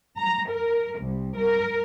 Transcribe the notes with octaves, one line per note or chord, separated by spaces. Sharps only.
A#5
A#4
C2
A#4